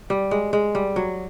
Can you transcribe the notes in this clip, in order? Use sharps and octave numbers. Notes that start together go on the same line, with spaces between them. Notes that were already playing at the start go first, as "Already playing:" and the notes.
G3
G#3
G#3
G3
F#3